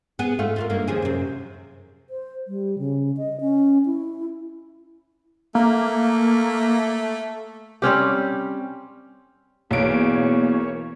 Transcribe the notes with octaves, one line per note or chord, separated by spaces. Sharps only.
B3 G#4
G#2 A3 F4
F4 F#4 A#4
G2 A#3 D#4
D#2 F3 G#4
F#2 C3
C5
G3
C#3
D#5
C#4
E4
A3 A#3
G3 C4 C#4 G4
B1 E2 A#3 C#5 D7